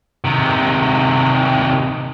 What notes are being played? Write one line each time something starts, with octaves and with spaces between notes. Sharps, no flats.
C3 D#3